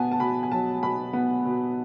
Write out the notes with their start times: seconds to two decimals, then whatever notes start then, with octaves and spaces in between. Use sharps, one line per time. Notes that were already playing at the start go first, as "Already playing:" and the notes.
Already playing: B2 B3 G#5 A5
0.11 A5
0.20 B2 B5
0.43 G#5
0.51 F#3 A5
0.83 B2 B5
1.13 B3
1.45 B2